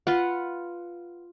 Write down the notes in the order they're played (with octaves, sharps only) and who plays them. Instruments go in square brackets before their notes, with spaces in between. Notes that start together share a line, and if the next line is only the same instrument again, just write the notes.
[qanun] F4 B4 F#5